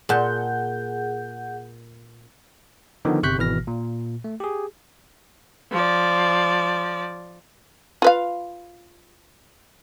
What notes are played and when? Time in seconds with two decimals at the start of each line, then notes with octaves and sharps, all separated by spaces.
0.09 A#2 G#4 F#5 A5 G6
3.05 D3 D#3 F3 B3 D#4
3.23 G1 C3 C#6 F#6 G6 B6
3.38 G#1 B2 E3 F6 A#6
3.67 A#2
4.24 A3
4.40 G4 G#4
5.71 F3 D5
8.02 F4 B4 F5